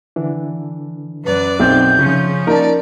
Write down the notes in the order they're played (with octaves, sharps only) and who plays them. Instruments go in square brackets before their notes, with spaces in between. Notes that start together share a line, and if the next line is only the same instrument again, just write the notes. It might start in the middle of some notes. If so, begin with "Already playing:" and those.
[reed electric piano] D3 E3 D4
[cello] F#2 D5 [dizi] B4
[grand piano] B1 C4 [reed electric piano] D#4 G#4 E5 [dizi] G6
[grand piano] C#3 [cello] F3 C#4
[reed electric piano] A#3 D#4 F4 [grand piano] A#4 A5 [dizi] D5